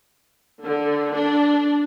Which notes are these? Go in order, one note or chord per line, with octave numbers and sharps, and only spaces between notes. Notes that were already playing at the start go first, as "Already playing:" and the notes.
D3
D4